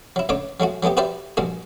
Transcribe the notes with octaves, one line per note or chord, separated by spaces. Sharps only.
F#3 E4
C#2 A2 D3 C#5 D6
F#3 G#3 A3 F#4
F#3 G#3 A3 B3 G4
F#4 G4 B4 C5 D5 E5
A#1 G2 D3 G#3 F#4